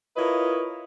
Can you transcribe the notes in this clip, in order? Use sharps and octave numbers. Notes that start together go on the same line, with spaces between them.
E4 F4 A#4 B4 C#5 D#5